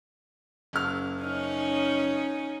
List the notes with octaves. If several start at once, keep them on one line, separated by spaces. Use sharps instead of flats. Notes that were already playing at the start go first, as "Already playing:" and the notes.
F#1 F6
C#4 D#4